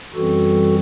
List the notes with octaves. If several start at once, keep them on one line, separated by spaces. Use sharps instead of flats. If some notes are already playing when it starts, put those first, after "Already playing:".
F#2 E3 G3 C4 F#4 A4